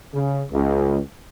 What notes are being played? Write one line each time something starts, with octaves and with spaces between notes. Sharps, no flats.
C#3
C#2